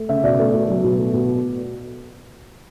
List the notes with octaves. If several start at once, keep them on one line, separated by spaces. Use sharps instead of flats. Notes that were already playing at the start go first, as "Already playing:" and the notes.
Already playing: A3
C#3 E5
B2 D5
A3
B2
F#3
B2
A3
B2